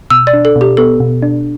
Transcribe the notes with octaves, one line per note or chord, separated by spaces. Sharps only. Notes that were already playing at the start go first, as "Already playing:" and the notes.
B2 E6
D5
D4
A4
B2
G4
B3 A4
B2
D4